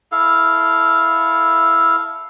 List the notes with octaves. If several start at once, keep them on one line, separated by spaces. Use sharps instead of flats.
E4 A4 F5